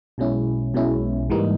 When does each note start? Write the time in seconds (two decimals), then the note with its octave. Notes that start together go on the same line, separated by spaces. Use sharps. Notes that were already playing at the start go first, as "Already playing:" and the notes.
0.18 B1 B2 G#3 C#4 E4
0.74 B1 B2 G#3 C#4 E4
1.30 G#2 E3 G3 A#3 D#4